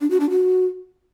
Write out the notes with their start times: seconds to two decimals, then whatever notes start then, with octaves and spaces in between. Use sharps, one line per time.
0.01 D4
0.10 F#4
0.20 D4
0.30 F#4